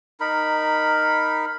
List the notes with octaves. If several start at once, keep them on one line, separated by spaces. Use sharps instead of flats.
D#4 A#4 B5